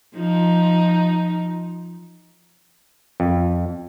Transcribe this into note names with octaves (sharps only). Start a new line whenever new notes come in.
F3 D#4
F2